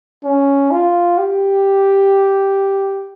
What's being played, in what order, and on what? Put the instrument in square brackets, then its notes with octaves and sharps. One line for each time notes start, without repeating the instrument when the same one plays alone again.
[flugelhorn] C#4
F4
G4